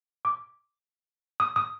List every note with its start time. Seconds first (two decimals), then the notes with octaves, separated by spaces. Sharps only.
0.25 D6
1.40 D#6
1.56 D#6